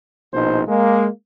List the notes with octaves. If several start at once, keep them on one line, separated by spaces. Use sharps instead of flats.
A#1 B2 D#4 C5
G#3 A#3